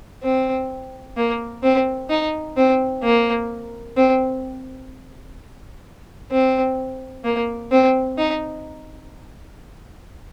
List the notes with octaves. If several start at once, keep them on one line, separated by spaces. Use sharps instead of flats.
C4
A#3
C4
D#4
C4
A#3
C4
C4
A#3
C4
D#4